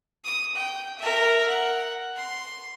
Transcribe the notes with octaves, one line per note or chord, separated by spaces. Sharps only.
D#6
G5
A#4 E5
F#5
C6